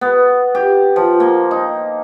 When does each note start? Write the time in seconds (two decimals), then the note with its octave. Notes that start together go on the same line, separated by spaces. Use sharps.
0.01 B3
0.55 G4
0.96 F3
1.20 A#3
1.51 D#4